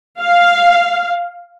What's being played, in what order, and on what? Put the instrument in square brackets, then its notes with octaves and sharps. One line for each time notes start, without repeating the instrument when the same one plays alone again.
[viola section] F5